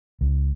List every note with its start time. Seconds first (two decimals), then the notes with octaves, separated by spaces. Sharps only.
0.21 C#2